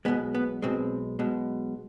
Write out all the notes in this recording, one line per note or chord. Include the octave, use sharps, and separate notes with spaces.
B1 B2 G#3 B3
B3
B1 B2 G#3 C4
B1 B2 G#3